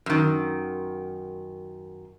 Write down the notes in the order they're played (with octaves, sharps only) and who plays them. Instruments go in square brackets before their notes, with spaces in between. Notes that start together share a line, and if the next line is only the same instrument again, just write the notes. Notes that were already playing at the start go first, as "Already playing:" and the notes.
[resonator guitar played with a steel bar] F#2 D#3